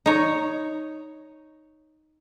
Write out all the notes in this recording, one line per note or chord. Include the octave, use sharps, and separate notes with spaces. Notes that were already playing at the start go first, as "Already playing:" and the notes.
D#4 C#5